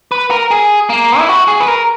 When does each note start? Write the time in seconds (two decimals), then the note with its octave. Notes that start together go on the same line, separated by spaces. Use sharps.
0.12 B4
0.31 A#4
0.51 G#4
0.89 A#3
1.19 E4
1.29 F#4
1.48 G#4
1.60 B4
1.68 A#4